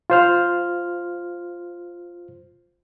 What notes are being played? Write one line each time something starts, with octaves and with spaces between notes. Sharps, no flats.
F4 C5 F6